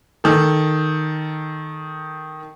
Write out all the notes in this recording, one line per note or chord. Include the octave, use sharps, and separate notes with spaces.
D#3 A4